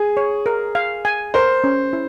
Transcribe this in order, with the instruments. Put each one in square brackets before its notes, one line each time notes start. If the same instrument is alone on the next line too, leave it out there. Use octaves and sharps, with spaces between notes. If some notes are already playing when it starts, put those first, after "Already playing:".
Already playing: [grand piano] G#4 [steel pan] G#5
[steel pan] C#5
A#4
F5
G#5
[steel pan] A#4 [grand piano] C5
[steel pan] C#4
E4